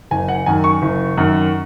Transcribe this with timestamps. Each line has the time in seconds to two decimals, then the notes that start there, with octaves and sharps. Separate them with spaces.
0.11 F#1 G#5
0.28 F#5
0.46 F#2 D#3 G#5
0.64 C#6
0.82 F#1
1.17 F#2 D#3